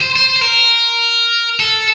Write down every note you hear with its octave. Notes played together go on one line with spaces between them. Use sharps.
C5
C5
C5
A#4
A4